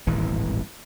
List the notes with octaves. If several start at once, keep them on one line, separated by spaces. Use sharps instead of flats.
D#1 G#1 A2 E3